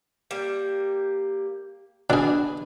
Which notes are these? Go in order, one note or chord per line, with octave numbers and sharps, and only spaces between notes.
G3 A#3
B2 D4 G#4 B4